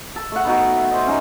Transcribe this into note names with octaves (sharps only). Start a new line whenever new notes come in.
A4
A3 F#5
B3 D#4 F#4
E5
C5 D#5
C#4 D#4 F#4